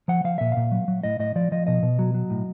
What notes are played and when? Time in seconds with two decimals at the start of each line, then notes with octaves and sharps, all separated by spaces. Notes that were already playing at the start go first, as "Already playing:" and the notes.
0.08 F3 F#5
0.24 F3 F5
0.38 A#2 E5
0.52 A#2 F5
0.71 F#3
0.88 F#3
1.03 A2 D#5
1.19 A2 D#5
1.36 F3 D5
1.52 F3 D#5
1.67 B2 D#5
1.83 B2
1.99 F#3
2.14 F#3
2.30 A2